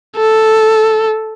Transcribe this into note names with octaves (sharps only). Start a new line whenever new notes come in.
A4